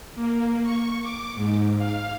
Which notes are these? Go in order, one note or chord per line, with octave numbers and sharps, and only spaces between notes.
A#3
C#6
D6
G#2
F5